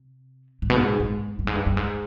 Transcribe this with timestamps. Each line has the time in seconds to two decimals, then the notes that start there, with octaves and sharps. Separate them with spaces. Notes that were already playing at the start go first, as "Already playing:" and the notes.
Already playing: C3
0.62 G#2
0.70 B2
0.77 G#2
1.00 G#2
1.39 G2
1.47 G#2
1.55 G2
1.66 G2
1.77 G#2